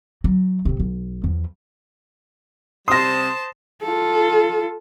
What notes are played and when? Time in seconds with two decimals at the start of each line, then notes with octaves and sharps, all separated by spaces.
0.24 F#3
0.65 D1 C3
0.80 B1
1.24 E2 F3
2.88 C3 G3 C5 A5 C6 D#6 A#6
3.83 F4 A4